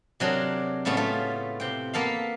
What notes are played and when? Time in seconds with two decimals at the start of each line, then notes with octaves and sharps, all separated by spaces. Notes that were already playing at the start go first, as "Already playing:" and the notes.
0.20 C3 F#3 D4 G#4 A#4
0.85 A2 C#3 A3 B3 C#4
0.97 A3 C#4 F4
1.60 C3 G5
1.93 A#3 B3 A4 F5